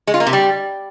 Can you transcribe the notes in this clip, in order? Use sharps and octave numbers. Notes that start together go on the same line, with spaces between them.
G#3
F4
A#3
C3
G3